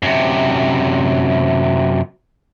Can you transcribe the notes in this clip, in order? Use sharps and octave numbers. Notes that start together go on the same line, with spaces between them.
F#2 C3